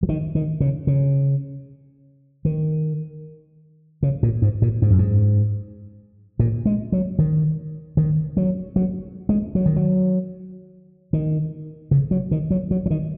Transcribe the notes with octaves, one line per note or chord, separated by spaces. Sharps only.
F#3
D#3
D#3
C#3
C#3
D#3
C#3
A#2
G#2
A#2
G#2
F#2
G#2
A#2
G#3
F#3
D#3
D#3
F#3
F#3
G#3
F#3
D#3
F#3
D#3
C#3
F#3
D#3
F#3
F#3
F#3
D#3